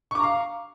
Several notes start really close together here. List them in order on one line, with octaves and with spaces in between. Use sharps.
C#6 D6 A#5 F5